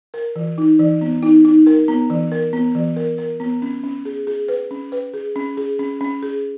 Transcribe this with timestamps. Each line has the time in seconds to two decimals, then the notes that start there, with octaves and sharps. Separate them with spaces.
0.14 A#4
0.36 E3
0.58 D#4
0.79 E3
1.01 B3
1.23 D#4
1.45 D#4
1.67 A#4
1.88 B3
2.10 E3
2.32 A#4
2.53 B3
2.75 E3
2.96 A#4
3.18 A#4
3.40 B3
3.62 C#4
3.84 C#4
4.05 G#4
4.27 G#4
4.48 B4
4.71 C#4
4.92 B4
5.14 G#4
5.36 C#4
5.57 G#4
5.79 C#4
6.01 C#4
6.22 G#4